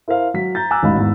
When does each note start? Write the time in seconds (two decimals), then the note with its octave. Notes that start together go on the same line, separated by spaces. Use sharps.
0.08 E4 A#4 C5 F5
0.34 F#3 B6
0.55 A#5 G6 A6
0.71 G#5 A#5 D6 E6 F#6
0.83 E1 A1 D#4 F5 B5
0.96 E2 G#2